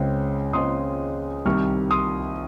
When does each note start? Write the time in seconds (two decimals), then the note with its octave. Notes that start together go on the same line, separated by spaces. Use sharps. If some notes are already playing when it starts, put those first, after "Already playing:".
Already playing: C#2 C#3 G#3 C4 G5
0.53 C#2 C#3 G#3 C4 C6 D#6
1.45 C2 C3 D#3 G3 C#6 F6
1.91 C6 D#6